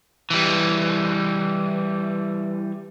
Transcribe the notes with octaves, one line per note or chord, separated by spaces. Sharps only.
E3 G3